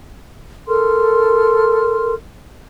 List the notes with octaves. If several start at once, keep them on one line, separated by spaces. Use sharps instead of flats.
A4 A#4 C6 F6